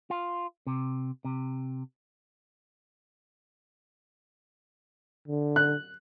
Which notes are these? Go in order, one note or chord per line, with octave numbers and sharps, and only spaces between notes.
F4
C3
C3
D3
F#6